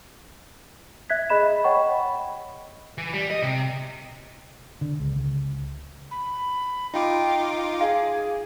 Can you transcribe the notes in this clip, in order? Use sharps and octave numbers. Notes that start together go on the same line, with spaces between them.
E5 F#6 G#6 B6
G#4 D#5 B5 B6 E7
C#5 D#5 F#5 G5 B5 C#6
E3
G3
D#5
C3
D3
C#2
C#2
B5
D#4 F4 G5 D6
G#4 F5